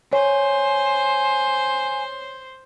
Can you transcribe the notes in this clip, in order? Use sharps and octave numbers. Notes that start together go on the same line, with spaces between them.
C5 C#5 G#5